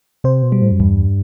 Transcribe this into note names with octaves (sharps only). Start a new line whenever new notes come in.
C3 C5
B2
G3
A2
F#2
E2 G2